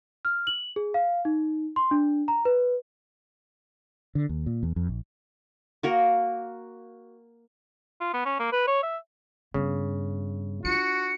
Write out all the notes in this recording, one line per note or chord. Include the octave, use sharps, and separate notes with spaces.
F6
F#7
G#4
F5
D#4
C6
D4
A#5
B4
D3
D#2
A#2
E2
F2
A#1
A#3 F#4 A#4
F4
B3
C#4
A#3
B4
C#5
E5
G2 C#3 B3
D4 F4 F#4 C#7